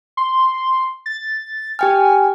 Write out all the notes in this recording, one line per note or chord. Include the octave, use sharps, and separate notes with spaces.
C6
A6
G4 G5 G#5 F6